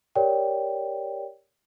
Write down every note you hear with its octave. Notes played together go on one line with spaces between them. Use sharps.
G4 A#4 C#5 D5 G5